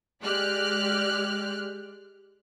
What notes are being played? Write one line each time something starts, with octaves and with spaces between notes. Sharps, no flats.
G#3 G4 D5 F6 F#6